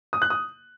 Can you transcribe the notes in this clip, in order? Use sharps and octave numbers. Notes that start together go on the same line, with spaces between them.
D#6
F#6
D#6